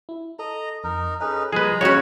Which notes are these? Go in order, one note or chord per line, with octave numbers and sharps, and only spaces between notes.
E4
A4 D#5 A#5
F2 D#4 A#4 A#5
C#4 D#4 G#4 A4 B4 D#5
F3 G3 G#3 A#3 G#4 B4 A#5
C#3 C#4 F#4 C#5